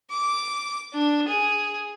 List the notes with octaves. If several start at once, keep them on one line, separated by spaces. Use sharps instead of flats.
D6
D4
G#4